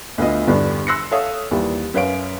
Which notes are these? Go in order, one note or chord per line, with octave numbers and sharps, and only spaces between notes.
D2 B3 F4 D#5
E2 G2 B2 D3 G3 D4
C6 E6 F#6 A#6 C7 C#7
A4 C#5 E5 F5 D#6
D#2 E3 G3
F#2 B4 C#5 F5 D7